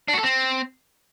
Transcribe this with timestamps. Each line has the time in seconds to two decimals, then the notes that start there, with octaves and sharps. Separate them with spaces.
0.08 D4
0.14 F#4
0.19 A4
0.24 C4